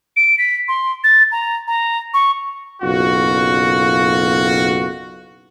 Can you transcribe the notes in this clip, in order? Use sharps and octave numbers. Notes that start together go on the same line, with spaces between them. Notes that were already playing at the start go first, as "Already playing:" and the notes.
D7
B6
C6
A6
A#5
A#5
C#6
F#1 B1 F4 F#4